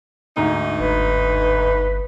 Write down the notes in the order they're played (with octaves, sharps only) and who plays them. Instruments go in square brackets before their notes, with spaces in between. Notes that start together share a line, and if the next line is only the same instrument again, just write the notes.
[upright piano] D2 G#2 A#5 [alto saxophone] D#4
[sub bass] G1 [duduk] B4